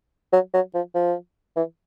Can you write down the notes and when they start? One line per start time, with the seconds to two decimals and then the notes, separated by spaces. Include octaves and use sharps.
0.33 F#3
0.54 F#3
0.75 F3
0.95 F3
1.56 E3